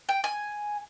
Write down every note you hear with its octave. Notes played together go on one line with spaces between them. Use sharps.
G5
G#5